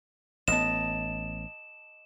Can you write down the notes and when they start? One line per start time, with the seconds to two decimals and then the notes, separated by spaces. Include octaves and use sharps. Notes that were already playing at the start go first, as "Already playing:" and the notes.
0.48 A1 B3 D#5 A5 E7